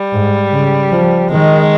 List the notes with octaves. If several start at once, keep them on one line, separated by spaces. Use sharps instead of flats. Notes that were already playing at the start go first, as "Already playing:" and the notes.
Already playing: G3
G#2
C#3
F3
D#3 G#3